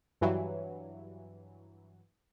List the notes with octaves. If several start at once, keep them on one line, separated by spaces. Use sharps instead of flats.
G2 E3 F#3